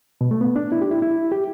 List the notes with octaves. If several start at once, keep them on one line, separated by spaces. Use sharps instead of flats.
B2
A3
B3
D4
E4
G4
E4
E4
G4